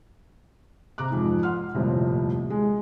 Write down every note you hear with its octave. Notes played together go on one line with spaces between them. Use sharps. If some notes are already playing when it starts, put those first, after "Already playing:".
C3 A#5 D6 F#6
F2 G#2
F#5 C6 F6
D#1 C2 F2 A2 C3
G#3